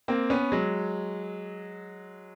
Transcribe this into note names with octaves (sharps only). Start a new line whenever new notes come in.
A#3 C4
B3 C#4
F#3 G#3